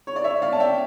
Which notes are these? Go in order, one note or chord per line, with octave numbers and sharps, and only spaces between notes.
C#5
D5
C#5 E5
D5 F5
A5
E5 G5